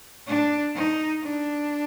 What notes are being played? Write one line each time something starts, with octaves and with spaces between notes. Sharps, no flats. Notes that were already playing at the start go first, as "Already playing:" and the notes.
D4
D#4
D4